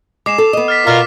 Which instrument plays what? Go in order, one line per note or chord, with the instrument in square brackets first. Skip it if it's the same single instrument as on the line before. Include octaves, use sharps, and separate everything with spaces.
[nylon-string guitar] G#3 [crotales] D6 C7 E7
[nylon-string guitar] A4
B3 D#5
[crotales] F6 A6 B6
[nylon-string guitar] B2 [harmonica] F4 A#4